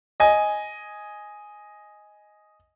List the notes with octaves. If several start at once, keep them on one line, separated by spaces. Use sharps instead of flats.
D#5 G#5